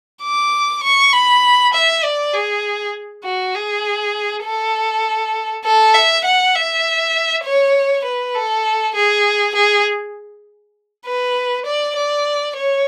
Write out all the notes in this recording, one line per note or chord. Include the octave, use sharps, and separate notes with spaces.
D6
C#6
B5
E5
D5
G#4
F#4
G#4
A4
A4
E5
F#5
E5
C#5
B4
A4
G#4
G#4
B4
D5
D5
C#5